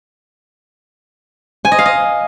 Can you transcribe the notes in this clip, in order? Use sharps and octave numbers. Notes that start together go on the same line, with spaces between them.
G#5
D#5
F5
D#5